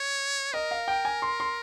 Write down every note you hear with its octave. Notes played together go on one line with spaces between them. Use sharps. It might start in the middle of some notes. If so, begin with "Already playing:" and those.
Already playing: C#5
A#4 D#5
F5
G5
G#5
C6
C6